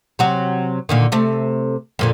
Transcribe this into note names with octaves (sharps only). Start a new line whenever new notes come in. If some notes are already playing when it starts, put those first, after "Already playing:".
C3 F#3 F#4
A#2 D3 D#3
C3 A3
F2 A#2 D3